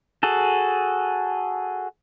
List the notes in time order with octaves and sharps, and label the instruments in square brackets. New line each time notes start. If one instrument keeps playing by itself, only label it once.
[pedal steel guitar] F#4 G#4 A4